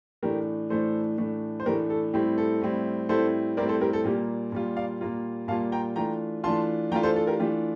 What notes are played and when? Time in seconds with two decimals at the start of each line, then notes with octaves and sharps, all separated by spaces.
0.23 A2 E3 A3 D4 G4 A#4
0.70 A2 E3 A3 D4 A4 C5
1.18 A2 E3 A3 D4
1.60 C5
1.66 A2 E3 A3 D4 G4 A#4
1.90 A4
2.13 A2 G3 C4 E4 G4
2.38 A4
2.61 A2 G3 C4 E4
3.09 A2 G3 C4 E4 A4 C5
3.57 A2 G3 C4 E4 A#4 D5
3.69 A4 C5
3.81 G4 A#4
3.93 A4
4.05 A#2 G3 A#3 F4 G4
4.52 A#2 G3 A#3 F4
4.76 D5 F5
5.01 A#2 G3 A#3 F4
5.48 A#2 G3 A#3 F4 F5 A5
5.72 G5 A#5
5.96 E3 A3 D4 F4 G5 A#5
6.44 E3 A3 D4 F4 A5 C6
6.92 E3 A3 D4 F4 G5 A#5
7.03 A4 C5
7.16 A4
7.27 G4 A#4
7.39 E3 A3 D4 F4 G4